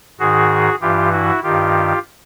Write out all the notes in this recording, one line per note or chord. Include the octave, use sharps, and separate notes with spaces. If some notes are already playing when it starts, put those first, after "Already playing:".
G#2 D#3 F#4 G#4
G2 E3 F4 G4
E4 F#4
G2 D#3 F4 G4